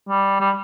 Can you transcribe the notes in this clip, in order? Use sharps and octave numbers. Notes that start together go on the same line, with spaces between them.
G3
G3